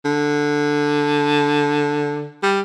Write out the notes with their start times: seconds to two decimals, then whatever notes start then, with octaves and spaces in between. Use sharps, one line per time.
0.05 D3
2.43 G3